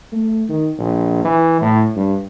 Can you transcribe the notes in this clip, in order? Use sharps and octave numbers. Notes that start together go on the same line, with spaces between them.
A3
D#3
A#1
E3
A2
G2